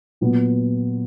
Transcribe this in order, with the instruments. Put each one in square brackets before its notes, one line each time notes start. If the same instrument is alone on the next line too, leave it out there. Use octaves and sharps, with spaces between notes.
[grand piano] A#2 F#3 B3